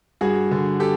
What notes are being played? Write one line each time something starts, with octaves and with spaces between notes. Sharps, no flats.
G2 F#4 G#4
D3
G4 A4